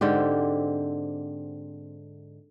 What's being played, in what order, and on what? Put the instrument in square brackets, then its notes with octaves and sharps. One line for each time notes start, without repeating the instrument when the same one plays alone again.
[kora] G#2 D3 C4 G4